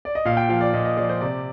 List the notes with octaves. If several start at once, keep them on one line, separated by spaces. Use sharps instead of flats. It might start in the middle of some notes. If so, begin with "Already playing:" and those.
D5
D#5
A#2 F5
G5
F3 F5
D5
A#2 D#5
D#5
F3 D5
C5
C3 D5